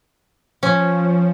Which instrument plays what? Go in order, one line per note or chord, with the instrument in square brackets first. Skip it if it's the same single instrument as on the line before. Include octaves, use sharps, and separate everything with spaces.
[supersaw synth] F3 [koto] C#4